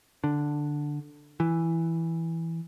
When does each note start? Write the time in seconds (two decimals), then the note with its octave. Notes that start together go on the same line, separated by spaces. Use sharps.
0.24 D3
1.40 E3